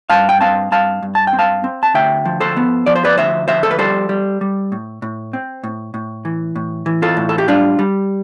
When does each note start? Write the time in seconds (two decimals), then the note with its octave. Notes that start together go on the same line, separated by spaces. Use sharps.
0.10 G2 F5 A5
0.29 G5
0.41 C4 F5 A5
0.71 G2 F5 A5
1.03 G2
1.15 A5
1.27 G5
1.33 C4
1.39 F5 A5
1.64 C4
1.83 A5
1.94 D2 E5 G5
2.25 F3
2.41 A4 C5
2.57 B3
2.86 F3 D5
2.96 C5
3.05 B4 D5
3.18 D2 C5 E5
3.48 F3 C5 E5
3.63 A4
3.71 B4
3.79 G3 A4 C5
4.09 G3
4.41 G3
4.72 A2
5.02 A2
5.33 C4
5.64 A2
5.94 A2
6.25 E3
6.56 A2
6.86 E3
7.02 F4 A4
7.17 A2
7.29 A4
7.38 G4
7.48 G3 D4 F4
7.79 G3